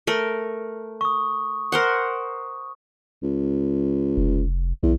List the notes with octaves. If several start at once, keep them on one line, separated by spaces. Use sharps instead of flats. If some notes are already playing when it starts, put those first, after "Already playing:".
A3 A#4
C#6 D#6
A#4 C5 F#5
C#2
F1
B1 E2